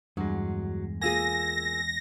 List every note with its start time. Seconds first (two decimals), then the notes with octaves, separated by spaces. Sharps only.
0.17 E2 G2 F#3 G#3
1.01 A#3 F4 G#4 G#5 E6 A#6